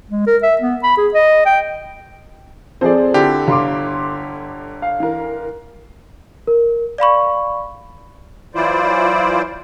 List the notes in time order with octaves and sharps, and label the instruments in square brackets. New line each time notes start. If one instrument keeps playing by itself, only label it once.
[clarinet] G#3
A#4
E5
B3
B5
G#4
D#5
G5
[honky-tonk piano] F3 A4 C5 [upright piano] C4 G#4 D5
[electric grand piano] D3 E4 G4
[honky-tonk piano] G1 [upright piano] F5 C6 D6
[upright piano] F5
[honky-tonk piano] E3 A#4
[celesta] A#4
D5 F5 B5 C#6
[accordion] E3 F#3 E4 F4 C5 D5